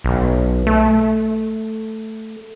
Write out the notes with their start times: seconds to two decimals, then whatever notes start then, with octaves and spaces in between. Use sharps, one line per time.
0.04 B1
0.67 A3